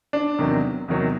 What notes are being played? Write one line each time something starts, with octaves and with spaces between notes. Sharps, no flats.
D4
E2 C3 D#3 F#3
E2 C3 D#3 F#3